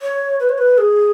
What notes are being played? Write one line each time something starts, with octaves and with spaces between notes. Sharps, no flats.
C#5
B4
C#5
B4
G#4